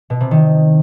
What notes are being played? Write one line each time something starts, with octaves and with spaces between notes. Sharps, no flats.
B2
C3
D#3